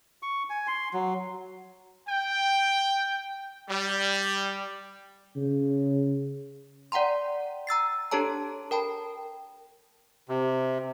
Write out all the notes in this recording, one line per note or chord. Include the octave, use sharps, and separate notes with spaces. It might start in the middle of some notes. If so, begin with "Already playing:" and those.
C#6
G#5
C6
F#3
G5
G3
C#3
D5 F#5 G5 A#5 C6
A#5 E6 A6 C7
D4 G4 A4 C#5 A5 A#5
A#4 G5 A5 B5
C3